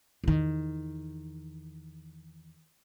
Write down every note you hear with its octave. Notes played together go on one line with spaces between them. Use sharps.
E2 D#3